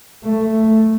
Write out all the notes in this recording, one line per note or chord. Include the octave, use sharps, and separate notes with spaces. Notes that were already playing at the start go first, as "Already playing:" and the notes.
A3